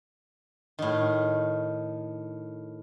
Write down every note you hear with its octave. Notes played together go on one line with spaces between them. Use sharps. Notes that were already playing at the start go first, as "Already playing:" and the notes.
A2 D#3